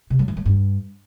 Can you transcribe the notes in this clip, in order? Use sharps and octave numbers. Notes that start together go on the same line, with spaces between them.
C3
F#3
E3
F#3
G2